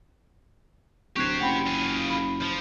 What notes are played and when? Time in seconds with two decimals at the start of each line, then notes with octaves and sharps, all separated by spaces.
1.16 D1 G4 C5 C#6 F#6 G#6
1.40 F#1 F#5 G5 B5
1.67 F4 G#4
2.10 B5
2.42 F3